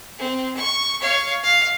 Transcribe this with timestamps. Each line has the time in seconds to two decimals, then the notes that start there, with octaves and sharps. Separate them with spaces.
0.18 C4
0.57 C#6
1.01 C#5 F5
1.43 F5